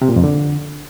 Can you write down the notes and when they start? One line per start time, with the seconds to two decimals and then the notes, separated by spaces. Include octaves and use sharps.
0.02 C3
0.09 A#2
0.16 F2
0.24 D3